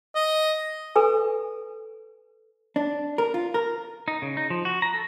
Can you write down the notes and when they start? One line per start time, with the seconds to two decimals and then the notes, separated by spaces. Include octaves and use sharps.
0.15 D#5
0.96 A4 B4 G#5
2.76 D4
3.18 A#4
3.34 F4
3.54 A#4
4.08 D#4
4.22 C#3
4.37 D#4
4.50 F3
4.65 F#4
4.82 A#5
4.94 A4